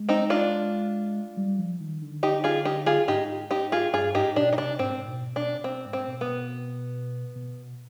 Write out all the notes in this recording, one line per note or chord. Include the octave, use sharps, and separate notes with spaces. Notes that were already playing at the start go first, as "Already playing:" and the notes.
Already playing: G#3
C4 D#4
D4 F4
G3
F3
D#3
D3
D#4 G4
F4 G#4
D#4 G4
F4 G#4
G#2 D#4 G4
D#4 G4
F4 G#4
G2 F4 G#4
G#2 D#4 G4
B2 D4
D#4
C3 D4
G#2 C4
B2
B2 D4
C3
B2 C4
G#2
C4
B2
B3
B2
B2